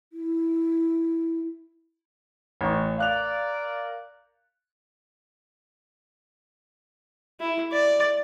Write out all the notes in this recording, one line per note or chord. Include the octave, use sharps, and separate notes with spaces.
E4
A1 C#6
A#4 D5 F5 F#6 F7
E4
D5